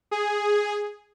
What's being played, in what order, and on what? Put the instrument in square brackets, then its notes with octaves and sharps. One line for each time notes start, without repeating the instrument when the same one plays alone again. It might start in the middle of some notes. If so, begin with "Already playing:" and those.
[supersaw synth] G#4